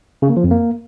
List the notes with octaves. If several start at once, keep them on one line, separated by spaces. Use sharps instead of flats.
C#3
A#3
F3
F2
A#3